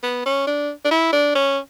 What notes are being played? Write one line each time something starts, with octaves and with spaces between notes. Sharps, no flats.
B3
C#4
D4
D4
E4
D4
C#4